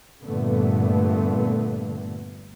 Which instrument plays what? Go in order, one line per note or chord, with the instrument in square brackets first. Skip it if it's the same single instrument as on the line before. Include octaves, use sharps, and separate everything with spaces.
[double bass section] G2 A#2 D3 A3 B3